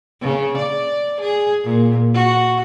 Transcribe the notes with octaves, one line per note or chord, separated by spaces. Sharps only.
C#3
D5
G#4
A#2
F#4